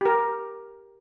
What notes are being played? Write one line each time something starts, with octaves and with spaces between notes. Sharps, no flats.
G4 A#4